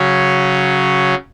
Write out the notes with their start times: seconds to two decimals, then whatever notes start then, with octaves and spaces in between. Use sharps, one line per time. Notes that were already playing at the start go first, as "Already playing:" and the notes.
Already playing: C#3 F#3 C#4